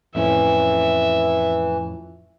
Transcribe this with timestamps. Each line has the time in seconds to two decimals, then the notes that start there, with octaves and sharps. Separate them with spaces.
0.15 F2 A2 E3 C#4 E5